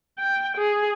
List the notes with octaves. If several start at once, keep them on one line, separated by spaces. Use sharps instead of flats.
G5
G#4